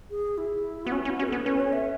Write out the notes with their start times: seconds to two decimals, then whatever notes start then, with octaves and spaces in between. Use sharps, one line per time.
0.11 G#4
0.38 E4
0.86 B3 F#4
0.92 C#4 E4
1.05 C#4
1.10 F#4
1.19 C#4
1.23 B4
1.28 B3 A4
1.46 C#4 B4
1.60 C#5
1.73 E5